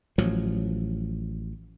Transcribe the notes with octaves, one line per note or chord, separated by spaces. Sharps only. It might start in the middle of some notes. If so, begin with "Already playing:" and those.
A1 A2 F3 F#3